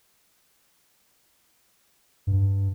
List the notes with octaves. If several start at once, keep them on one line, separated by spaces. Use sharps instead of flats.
G2